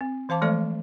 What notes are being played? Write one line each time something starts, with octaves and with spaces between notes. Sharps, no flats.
C4
E3 C5 F5 A5 D6
E3 F3 G#3 A3 A4 D5